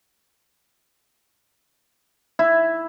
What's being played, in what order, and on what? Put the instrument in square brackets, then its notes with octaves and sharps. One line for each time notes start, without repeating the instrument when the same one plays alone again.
[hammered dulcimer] E4